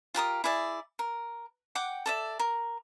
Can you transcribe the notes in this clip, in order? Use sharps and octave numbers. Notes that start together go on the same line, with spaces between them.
F4 G4 A#4 D#6
E4 G#4 D5 E5
A#4
F#5 G5 D6
A4 D5 E5
A#4